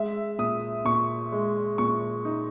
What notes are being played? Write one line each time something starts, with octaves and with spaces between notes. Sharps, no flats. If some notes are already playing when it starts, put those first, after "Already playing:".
Already playing: G#3 E5
A#2 D#6
A#2 C#6
G#3
A#2 C#6
D#4